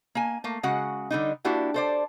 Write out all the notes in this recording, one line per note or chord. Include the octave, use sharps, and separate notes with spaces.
A#3 G#5
A3 A#3
C#3 G#3 F#4 F#5
D3 G3 D#4
A#3 D4 E4 F#4 G4
A4 C5 D5